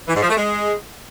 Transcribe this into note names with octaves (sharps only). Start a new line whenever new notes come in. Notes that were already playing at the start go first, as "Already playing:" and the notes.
E3
G#2
F3
A3
G#3